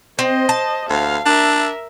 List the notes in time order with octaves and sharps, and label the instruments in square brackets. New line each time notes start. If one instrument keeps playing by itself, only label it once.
[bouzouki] C4 [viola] C5 D#5
[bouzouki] A5
[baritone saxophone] D2 [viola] F5
[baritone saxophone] D4 [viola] A#4 E5